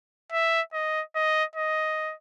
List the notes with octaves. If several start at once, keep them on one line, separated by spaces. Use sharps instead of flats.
E5
D#5
D#5
D#5